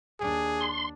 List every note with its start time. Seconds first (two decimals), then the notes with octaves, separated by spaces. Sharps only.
0.20 D#2 D4 G#4
0.61 C6